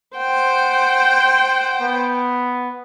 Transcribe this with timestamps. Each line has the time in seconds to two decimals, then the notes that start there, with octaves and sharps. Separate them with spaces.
0.17 C5 F#5 G5
1.81 B3